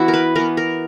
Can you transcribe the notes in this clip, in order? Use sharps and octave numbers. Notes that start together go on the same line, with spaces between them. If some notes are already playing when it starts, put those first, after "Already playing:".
Already playing: E3 B3 E4 F#4
A#4
B4
E3 B3 A#4
A#4